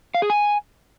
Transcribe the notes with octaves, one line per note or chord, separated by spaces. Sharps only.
F5
G#4
G#5